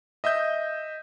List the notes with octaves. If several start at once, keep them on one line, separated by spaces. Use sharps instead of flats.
D#5 E5 D#6 G6